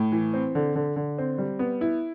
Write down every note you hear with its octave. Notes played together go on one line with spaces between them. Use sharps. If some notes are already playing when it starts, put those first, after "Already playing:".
Already playing: A2
E3
C4
D3
D3
D3
C4
G3
B3
E4